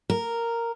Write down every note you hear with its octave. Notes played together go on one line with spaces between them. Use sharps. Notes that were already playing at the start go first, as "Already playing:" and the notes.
A#4